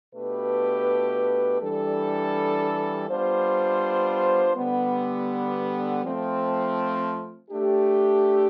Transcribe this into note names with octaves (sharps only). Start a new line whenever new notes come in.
B2 A3 D4 G4 B4
E3 G3 D4 A4
G3 B3 D4 F4 C5
D3 G3 B3
F3 A3 C4
A3 D4 G4